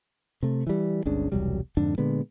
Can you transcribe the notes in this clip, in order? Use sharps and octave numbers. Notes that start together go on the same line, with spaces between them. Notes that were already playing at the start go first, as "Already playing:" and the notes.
C3 A3
E3 G3
G1 C#2 C#3 D4
E1 C2 F#3 G3
F2 G#2 D3 D4
A#2 D3 G#3 B3